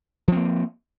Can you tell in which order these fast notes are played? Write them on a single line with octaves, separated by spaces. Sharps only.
F3 C4 A#3